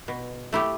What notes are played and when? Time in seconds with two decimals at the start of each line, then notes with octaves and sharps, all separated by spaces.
0.08 B2
0.53 A3 E4 G4